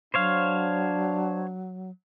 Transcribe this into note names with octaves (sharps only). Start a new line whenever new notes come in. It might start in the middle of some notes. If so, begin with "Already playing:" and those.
F#3 D4 C5 C#5 F5